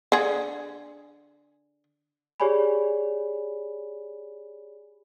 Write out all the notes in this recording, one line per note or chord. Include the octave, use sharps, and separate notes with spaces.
D3 G#4
G4 G#4 C#5 D5 G#5 B5